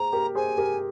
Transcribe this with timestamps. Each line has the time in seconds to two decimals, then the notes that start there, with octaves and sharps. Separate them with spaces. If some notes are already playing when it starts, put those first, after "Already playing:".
Already playing: G#4 C5 A#5
0.12 G4 A#4
0.35 G#4 C5 G#5
0.58 G4 A#4